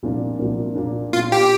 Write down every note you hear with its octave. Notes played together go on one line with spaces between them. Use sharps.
C2 A#2 F3 A#3 D4
C2 A#2 F3 A#3 D4
A#2 A#3 D4
A#2 A#3 D4 F4
G4